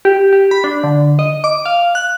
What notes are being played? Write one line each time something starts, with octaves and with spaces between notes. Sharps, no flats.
G4
G4
B5
D4
D3
D#5
D6
F5
F#6